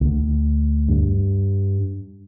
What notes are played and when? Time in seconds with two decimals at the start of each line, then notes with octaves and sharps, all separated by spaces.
0.01 D2
0.89 G2